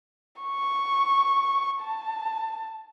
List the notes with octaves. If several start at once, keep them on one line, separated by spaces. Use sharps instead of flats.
C#6
A5